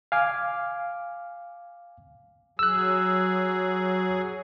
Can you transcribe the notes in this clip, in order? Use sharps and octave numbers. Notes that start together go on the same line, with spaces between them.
F5 G#5 D6
F#3 G#4 E6 F#6